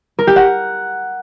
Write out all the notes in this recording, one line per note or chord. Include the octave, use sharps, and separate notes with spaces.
A#4
G4
F#5